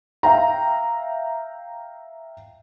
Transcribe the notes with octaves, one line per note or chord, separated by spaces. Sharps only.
E5 F5 G5 A#5